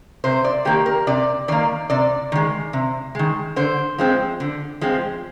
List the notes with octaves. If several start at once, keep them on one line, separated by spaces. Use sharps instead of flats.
C3 C5
D5
D#3 A#3 G4
A#4
C3 D5
D#3 A#3 D5
C3 D5
D#3 G#3
C3
D#3 G#3
D3 C5
F3 G#3 C4
D3
F3 G#3 C4